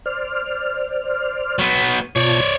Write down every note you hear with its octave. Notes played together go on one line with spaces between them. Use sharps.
C5 D5 F6
F#3 B3
B2 F4 C#5 D5 A5